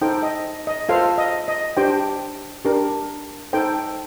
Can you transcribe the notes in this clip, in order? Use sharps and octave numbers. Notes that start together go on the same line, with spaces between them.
D#4 A4 C5 G5
D#5
D#5
F4 A4 C5 F5
D#5
D#5
D4 G4 C5 G5
D4 G4 A#4
D#4 A4 C5 G5